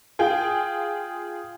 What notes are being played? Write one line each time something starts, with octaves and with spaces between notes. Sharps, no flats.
F4 G#4 G5